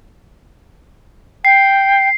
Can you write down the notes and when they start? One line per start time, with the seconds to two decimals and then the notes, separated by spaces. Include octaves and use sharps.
1.45 G5 C7